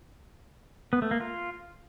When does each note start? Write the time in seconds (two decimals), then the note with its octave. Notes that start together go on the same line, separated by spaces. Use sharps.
0.93 B3
1.02 A3
1.11 A#3
1.20 F4